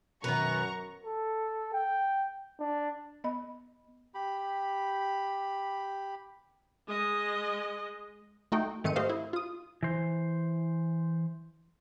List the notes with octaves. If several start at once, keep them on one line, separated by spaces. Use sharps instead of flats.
F#2 B2 D#3 B3 B4 A#5 C#6
A4
G5
D4
B3 D#5 B5
G4 B5
G#3 D#5
A3 D#4 F#4 G5
G#2 D#3 A3 C4 C#7 D#7
A3 G4 C5 D#5 F5
E4
F4 D#6
E3 C5